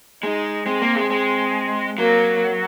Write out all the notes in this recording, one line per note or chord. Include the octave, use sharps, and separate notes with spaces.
G#3 D#4
G#3 C4
A#3
G#3
G#3
F#3 A#3